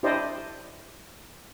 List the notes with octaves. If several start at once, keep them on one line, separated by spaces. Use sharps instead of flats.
D4 E4 G4 C5 D5 D#5